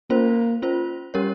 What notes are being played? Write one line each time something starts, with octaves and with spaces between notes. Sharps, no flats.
A#3 C#4 F4 C5
C#4 F4 C5
G3 C#4 G4 A#4 C#5